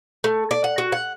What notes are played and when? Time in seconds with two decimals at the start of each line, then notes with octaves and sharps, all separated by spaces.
0.24 A3
0.51 D5
0.64 F#5
0.78 F#4
0.92 F#5